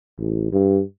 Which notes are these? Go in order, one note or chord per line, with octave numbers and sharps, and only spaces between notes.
A1
G2